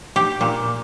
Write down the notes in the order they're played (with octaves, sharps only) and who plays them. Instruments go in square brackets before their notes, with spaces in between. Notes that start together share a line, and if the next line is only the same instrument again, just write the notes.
[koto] G4
A#2